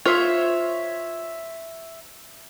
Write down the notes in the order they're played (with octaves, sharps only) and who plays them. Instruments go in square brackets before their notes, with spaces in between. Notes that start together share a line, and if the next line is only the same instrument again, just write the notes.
[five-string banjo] F4 C5 [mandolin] C#5 E5